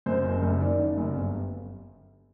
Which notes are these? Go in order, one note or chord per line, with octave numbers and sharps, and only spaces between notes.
F#2 C5
F#1
F#2
D#3 D5
F#1
F#2
G1